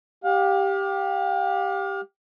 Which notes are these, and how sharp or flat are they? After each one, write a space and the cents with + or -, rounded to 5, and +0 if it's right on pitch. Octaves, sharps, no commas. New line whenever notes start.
G4 +0 F5 +35